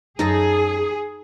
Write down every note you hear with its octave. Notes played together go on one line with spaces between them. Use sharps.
F#2 D#4 G#4 A4 C5 G#5 A#5